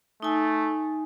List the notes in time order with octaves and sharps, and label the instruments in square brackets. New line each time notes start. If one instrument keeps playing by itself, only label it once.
[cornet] A3 [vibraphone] D#4 G#5